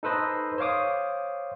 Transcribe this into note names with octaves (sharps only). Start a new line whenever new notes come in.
D#4 A4 B4 C5 D#5
C5 C#5 F5 D6 D#6